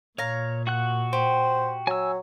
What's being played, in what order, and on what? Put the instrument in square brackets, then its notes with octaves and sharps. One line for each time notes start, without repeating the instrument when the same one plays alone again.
[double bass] A#2 [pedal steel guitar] C#5 [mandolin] F5 A#5
[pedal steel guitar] F#4 F#5 F#6
[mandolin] G4 [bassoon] C5
[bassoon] F#3 [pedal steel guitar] G#5 E6